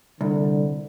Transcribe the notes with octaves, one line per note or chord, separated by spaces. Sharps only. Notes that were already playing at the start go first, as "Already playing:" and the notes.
C2 D3